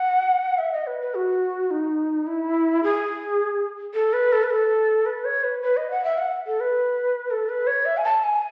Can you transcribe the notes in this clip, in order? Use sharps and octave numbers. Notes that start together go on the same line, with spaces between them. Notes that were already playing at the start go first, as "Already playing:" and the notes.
Already playing: F#5
E5
D#5
B4
B4
F#4
D#4
E4
G#4
A4
B4
A4
B4
A4
B4
C#5
B4
B4
D#5
F#5
E5
F#5
A4
B4
A4
B4
C#5
E5
G#5
A5
G#5